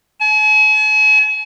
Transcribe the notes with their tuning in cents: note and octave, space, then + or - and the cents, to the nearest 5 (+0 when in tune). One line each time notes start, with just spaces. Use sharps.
G#5 +45